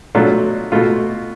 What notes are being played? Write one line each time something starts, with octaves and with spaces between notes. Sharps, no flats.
B2 F#3 A3 D4 F4
B2 A3 F4